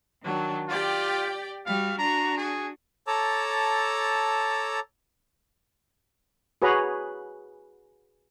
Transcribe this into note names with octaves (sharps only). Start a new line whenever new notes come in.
D#3 F#3 D4
F4 G4 D5 G5
G3 F#4 F5
D4 F#4 A#5
G#4
A4 C#5 A5 A#5 D6 E6
F#4 G#4 B4 C#5 A#5